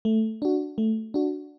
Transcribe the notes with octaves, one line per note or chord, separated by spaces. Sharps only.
A3
D4 F#4
A3
D4 F#4